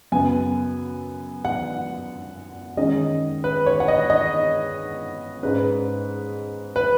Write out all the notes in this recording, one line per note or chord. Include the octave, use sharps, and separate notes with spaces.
F#2 C#3 B3 G#5
F#5
D#3 G#3 C#4 D#5
B4
C#5
F#5
D#5
D#5
G#2 G#3 C#4 B4
B4